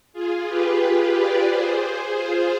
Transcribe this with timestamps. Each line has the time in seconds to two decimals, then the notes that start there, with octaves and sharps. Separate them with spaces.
0.13 F4 G#4
0.47 G4 B4
0.81 G4 B4
1.14 B4 D5
1.48 G#4 C5
2.15 F4 G#4